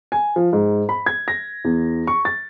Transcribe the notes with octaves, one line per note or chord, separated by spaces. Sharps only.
G#5
F3
G#2
B5
G#6
A#6
E2
C#6
A6